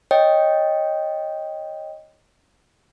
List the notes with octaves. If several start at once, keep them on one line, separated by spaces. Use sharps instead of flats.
C#5 D#5 G5